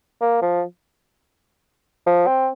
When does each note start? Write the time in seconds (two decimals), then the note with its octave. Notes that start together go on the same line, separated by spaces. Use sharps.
0.21 A#3
0.42 F3
2.07 F3
2.27 C4